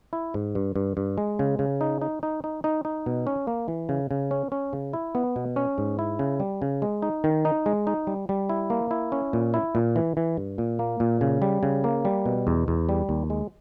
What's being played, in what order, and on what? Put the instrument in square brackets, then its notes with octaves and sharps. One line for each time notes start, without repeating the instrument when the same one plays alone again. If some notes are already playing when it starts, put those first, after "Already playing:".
[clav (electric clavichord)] E4
G#2
G2
G2
G2
G#3
C#3
C#3
D#4
D#4
D#4
D#4
D#4
D#4
B2
C#4
A#3
E3
C#3
C#3
C#4
C#4
C#3
E4
B3
B2
C#4
G#2
E4
C#3
G3
C#3
G#3
D#4
D#3
D#4
G#3
D#4
G3
G3
E4
A#3
E4
C#4
A#2
E4
A#2
E3
E3
G2
A#2
A#3
A#2
C#3
G3
C#3
A#3
G3
B2
E2
E2
G3
D#2
G#3